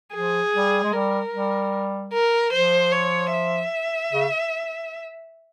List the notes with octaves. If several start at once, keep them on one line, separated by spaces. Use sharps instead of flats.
F3 G#4
G3
G#3
G3 A#4
G3
A#4
F3 C5
C#5
E5
C#3